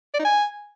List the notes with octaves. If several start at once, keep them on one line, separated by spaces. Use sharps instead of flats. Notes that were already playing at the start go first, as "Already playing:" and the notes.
D5
D#4
G#5